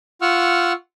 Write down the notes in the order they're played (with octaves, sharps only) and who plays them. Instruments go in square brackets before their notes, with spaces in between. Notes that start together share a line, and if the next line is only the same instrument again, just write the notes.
[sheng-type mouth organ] F4 F#5 C#6 E6 F6